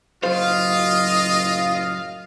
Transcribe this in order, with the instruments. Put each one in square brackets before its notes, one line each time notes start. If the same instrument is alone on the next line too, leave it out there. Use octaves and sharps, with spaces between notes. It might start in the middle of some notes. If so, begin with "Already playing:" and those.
[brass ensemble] F#1 A2 D#5 [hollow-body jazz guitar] F#3 C5 [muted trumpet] F4 [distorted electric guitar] F5